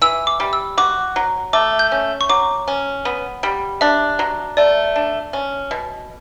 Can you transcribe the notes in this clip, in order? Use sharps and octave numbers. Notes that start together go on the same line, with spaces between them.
E3 E6
D6
G3
E6
F#4 D6
F#3
A3 D6
G6
C#4
C#6
F#3 D6
C#4
B3
G3
D4 E5
F#3
A3 D5
D4
C#4
B2